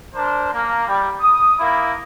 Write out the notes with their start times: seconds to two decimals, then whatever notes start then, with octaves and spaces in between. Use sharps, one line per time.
0.15 D4 A#4 C5
0.52 A#3
0.87 G3
1.20 D#6
1.59 A#3 E4